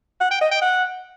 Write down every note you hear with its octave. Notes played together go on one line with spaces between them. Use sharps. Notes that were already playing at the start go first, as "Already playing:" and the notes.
F#5
G5
D#5
G5
F#5